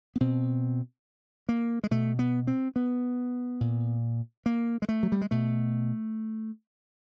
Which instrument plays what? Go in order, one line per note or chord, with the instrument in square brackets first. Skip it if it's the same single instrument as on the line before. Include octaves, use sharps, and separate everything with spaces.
[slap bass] B3
B2 C4
A#3
G#3
B2 A3
B3
C4
B3
A#2
A#3
G#3
A3
F#3
G3
G#3
B2 A3